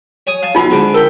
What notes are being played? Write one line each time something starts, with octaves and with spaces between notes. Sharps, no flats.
C#5 G#5 D#6
F5 G#5 A5
B1 B2 D#4 F4
G#2 D3 D6
A4 A#4 G5 B5